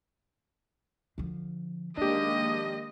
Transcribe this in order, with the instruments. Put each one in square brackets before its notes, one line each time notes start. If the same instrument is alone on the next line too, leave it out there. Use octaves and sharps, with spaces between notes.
[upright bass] D3 F3
[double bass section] D#3 G#3 A#3 [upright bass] F3 [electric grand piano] D4 G4 [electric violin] D#5